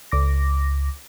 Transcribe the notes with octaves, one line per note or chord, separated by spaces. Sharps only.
C#2 D6 A#6